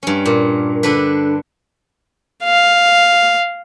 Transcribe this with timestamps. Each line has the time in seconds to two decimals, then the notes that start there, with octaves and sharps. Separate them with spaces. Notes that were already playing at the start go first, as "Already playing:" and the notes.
0.03 G2 C#4
0.26 A#2
0.83 D3 D4 B4
2.44 F5